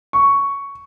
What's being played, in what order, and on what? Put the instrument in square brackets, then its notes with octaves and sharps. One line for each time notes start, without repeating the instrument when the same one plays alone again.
[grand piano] C#6